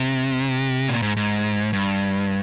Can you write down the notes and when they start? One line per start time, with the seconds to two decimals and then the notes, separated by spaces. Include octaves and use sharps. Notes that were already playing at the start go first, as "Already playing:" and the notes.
Already playing: C3
0.88 A#2
1.02 G#2
1.17 G#2
1.73 G2